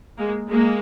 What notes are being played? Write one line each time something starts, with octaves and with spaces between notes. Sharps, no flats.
G#3 A#3
G#3 A#3